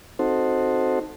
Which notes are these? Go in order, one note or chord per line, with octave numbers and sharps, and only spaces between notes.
C4 D#4 F#4 A4 C5